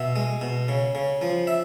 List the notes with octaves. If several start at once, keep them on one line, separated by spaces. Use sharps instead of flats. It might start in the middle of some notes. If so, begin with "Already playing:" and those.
Already playing: B2 E5
G#3
B2
C#3
C#3
F3
E5